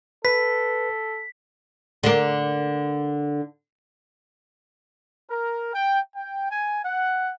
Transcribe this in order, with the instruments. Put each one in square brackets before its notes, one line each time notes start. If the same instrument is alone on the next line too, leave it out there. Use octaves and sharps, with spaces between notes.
[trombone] A4 [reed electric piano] B4 [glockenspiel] B6
[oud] D3 A#3
[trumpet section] A#4
G5
G5
G#5
F#5